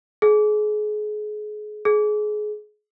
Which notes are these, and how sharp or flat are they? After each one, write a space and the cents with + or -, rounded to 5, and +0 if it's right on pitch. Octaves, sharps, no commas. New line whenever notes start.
G#4 +30
G#4 +25